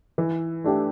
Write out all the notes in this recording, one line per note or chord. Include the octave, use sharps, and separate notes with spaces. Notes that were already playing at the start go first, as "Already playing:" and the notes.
E3
A3 D4 G4